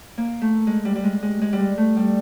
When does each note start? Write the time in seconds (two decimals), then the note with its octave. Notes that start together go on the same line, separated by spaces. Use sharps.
0.18 A#3
0.41 A3
0.67 G#3
0.85 G3
0.95 G3
1.04 G#3
1.23 G#3
1.42 G#3
1.53 G3
1.59 G#3
1.77 A3
1.97 G3